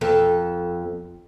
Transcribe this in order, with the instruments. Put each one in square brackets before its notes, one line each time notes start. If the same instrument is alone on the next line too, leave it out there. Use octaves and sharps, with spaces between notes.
[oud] F2 A4